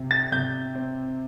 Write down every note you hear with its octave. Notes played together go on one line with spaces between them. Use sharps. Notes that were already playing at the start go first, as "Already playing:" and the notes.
Already playing: C3
A6
C3 G6
C4